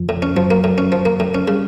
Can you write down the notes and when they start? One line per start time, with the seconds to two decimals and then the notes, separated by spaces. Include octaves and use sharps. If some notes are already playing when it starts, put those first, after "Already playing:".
Already playing: F2 F3
0.09 A2
0.22 C#4
0.36 F#2 F3 F#3
0.51 A#3
0.64 A2
0.78 C#4
0.92 F3
1.05 A#3
1.20 A2
1.35 C#4
1.48 C#3 G3